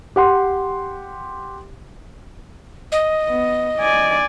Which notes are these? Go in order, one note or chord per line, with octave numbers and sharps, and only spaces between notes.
G4 F#5 C6
D#5
B3
D5 G#5